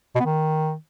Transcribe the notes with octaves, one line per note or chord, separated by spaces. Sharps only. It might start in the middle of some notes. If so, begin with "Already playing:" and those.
B2
B3
D#3